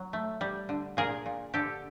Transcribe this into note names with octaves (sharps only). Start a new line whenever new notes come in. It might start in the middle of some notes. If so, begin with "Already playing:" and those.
Already playing: F#3
A3
G3
D3
A#2 G#4 A#4
A#2
D3 G4 A4